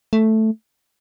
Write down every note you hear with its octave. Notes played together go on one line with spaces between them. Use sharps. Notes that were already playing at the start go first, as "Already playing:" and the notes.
A3